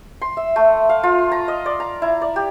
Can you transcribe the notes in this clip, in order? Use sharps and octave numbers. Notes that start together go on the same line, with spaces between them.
C6
E5
A3
F5
F4
A#5
D#5
D5
A#5
E4
D5
G4